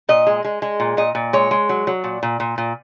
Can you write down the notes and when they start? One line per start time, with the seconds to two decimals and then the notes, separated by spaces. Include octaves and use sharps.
0.09 A#2 D#5
0.27 G#3
0.44 G#3
0.62 G#3
0.80 A#2
0.97 A#2 D#5
1.15 A#2
1.33 G#3 C#5
1.51 G#3
1.69 F#3
1.87 F#3
2.04 A#2
2.23 A#2
2.40 A#2
2.58 A#2